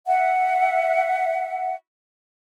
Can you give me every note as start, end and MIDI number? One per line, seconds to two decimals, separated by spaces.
0.07 1.75 76
0.07 1.75 78